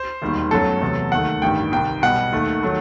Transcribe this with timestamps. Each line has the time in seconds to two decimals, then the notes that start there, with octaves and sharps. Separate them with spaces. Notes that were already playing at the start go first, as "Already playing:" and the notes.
Already playing: C5
0.22 E1 D#2 D#3 G3
0.51 G1 F#2 F#3 A3 A4
0.82 E2 C3 F#3 A3
1.12 D#2 D#3 A3 F#5
1.42 A1 G2 D#3 G3 G5
1.72 C2 C3 D#3 G5
2.02 B1 B2 G3 F#5
2.33 D#2 D#3 A3
2.63 D#3 F#3 A3